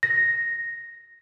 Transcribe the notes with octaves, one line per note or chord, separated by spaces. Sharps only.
A#6